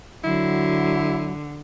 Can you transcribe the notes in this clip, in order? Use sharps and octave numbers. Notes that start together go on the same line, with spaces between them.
D3 F#3 E4